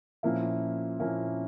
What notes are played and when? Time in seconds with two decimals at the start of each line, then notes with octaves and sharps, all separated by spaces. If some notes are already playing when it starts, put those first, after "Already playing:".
0.23 A#2 F3 A#3 C#4 E4
1.00 A#2 F3 A#3 C#4 E4